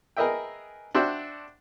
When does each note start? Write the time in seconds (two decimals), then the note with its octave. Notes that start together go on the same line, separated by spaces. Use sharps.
0.17 G#4 A#4 B4 D#5 E5 G5
0.95 D4 F#4 C5 E5 G5